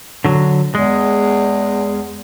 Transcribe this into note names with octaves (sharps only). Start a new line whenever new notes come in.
D3 F#3
E2 G#3